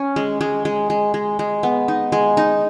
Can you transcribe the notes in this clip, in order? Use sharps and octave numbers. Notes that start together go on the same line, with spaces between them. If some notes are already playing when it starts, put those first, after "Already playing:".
Already playing: C#4
G#3
G#3
G#3
G#3
G#3
G#3
B3
D#4
G#3
D#4